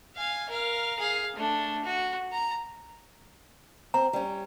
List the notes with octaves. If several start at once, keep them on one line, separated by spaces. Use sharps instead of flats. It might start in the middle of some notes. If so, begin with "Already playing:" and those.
F5 G#5
A#4 F5
G#4 F5
A3 D4
F#4
A#5
C4 A#5
G3 C#4